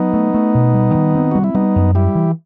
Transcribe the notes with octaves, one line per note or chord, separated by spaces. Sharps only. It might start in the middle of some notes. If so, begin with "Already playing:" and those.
Already playing: F#3 B3 D#4
A3
A3
B2
G3
D#3
C4
G3 F#4
E4
G3 B3 D#4
F#2
G3 E4 G4
E3